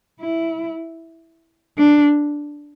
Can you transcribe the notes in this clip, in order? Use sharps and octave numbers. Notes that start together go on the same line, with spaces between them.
E4
D4